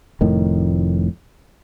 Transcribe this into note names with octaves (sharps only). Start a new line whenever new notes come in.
F1 F2 A2 D#3